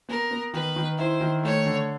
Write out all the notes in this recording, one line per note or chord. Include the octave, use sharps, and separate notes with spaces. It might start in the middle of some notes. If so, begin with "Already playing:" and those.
B3 A#4
B3
D#3 B4
D#3
E4 C5
D#3
A3 C#5
D3